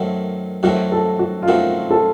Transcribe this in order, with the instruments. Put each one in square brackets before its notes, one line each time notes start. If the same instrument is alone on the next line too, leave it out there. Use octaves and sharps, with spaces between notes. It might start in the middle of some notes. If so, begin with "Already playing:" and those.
Already playing: [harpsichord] F#2 D#3 F#3 A3 C4
[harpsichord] F#2 D#3 F#3 A3 C4 [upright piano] F#4
[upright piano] A4
F#4
F4
[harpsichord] F#2 D#3 F#3 A3 C4 [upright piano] F#4
[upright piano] A4